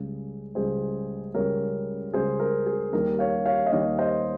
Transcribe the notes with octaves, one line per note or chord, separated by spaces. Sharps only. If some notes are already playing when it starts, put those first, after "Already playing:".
Already playing: C#2 C#3 G3 G#4
C#2 C#3 G3 G#4 C5
C#2 C#3 G3 A#4 C#5
C#2 C#3 G3 G#4 C5
A#4
G#4
D#2 D#3 G3 A#4
C#5 F5
C#5 F5
D#5
D#2 D#3 G3 C#5 F5
C5 D#5